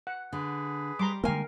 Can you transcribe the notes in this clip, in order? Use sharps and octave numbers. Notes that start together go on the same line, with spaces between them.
F#5
D3 G#4 B4
G3 A#5 C6 D6
D3 G#3 A#3 A#4 F5 G5 G#5